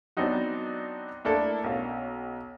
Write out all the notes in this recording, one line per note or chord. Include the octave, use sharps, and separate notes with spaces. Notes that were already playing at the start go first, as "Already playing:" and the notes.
F#3 B3 C4 D4 D#4 F#4
A3 A#3 D4 E4 A4
B1 C#4 F5